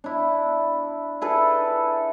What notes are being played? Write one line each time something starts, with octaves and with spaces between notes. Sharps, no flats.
D4 E4
E4 G#4 A4 B4